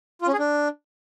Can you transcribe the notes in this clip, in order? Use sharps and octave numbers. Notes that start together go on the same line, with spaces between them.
F4
C#4
G#4
D4